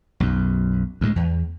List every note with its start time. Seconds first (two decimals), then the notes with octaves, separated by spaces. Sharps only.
0.20 B1 F#2
1.01 D2 A2 G#3
1.16 E2